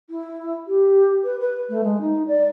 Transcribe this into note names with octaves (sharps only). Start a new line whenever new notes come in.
E4
G4
B4
B4
A3
G#3
D#4
D5